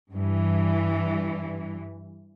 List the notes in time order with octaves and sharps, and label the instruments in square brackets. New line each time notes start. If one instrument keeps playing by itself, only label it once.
[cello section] G2 E3